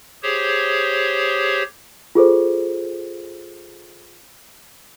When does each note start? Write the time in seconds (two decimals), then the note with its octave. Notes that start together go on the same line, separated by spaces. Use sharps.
0.23 G4 G#4 C5 C#5
2.15 F4 G#4 A4 C5